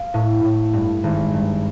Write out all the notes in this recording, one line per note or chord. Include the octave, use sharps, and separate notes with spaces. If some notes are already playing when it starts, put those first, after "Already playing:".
Already playing: F5
A2
A2
G2
G#1
G2